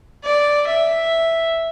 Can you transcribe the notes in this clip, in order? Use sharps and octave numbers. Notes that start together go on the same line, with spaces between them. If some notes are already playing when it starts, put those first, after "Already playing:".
D5
E5